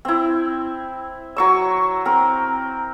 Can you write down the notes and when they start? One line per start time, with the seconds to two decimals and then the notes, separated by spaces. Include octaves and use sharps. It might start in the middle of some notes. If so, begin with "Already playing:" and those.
0.05 C4 E4
1.36 F#3 C#6 E6
2.05 C4 A#4